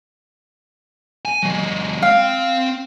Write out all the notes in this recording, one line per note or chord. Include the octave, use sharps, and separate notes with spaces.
G#5
F#3 G#3
C4 F5 G5